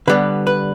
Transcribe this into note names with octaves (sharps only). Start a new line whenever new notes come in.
D3 G3 B3 B4
B4